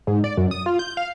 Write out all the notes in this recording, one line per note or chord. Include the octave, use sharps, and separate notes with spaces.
G#2
D5
F#2
D#6
F4
G6
F5